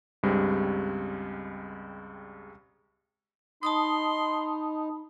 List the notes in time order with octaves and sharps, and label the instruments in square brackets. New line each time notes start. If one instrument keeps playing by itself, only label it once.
[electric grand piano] C#2 G2 G3 G#3 C4
[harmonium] D#4 [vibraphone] A5 B5 D#6 [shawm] C6